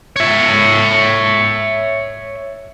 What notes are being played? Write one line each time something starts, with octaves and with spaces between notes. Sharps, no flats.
C#5 E5